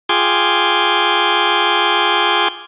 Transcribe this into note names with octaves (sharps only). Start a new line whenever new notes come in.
F4 G#4 G5 G#5 C6 D6